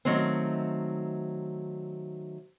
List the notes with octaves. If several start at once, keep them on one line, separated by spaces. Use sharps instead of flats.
D#3 F#3 A3 C4